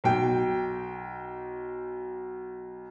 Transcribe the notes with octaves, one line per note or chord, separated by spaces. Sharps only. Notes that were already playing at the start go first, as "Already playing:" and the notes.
B1 G5